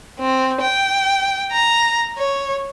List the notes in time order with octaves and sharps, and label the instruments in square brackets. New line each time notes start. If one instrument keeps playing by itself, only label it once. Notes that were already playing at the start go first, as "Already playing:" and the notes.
[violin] C4
G5
A#5
C#5